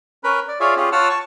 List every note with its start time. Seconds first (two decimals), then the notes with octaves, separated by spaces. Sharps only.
0.24 C#4 A#4 B4 B5
0.48 D5
0.60 F4 G#4 C#5 D5 E5 F5
0.77 C#4 F4 G4 G#4
0.92 F4 C#5 F#5 A5 E6 F6
1.09 A5 C#6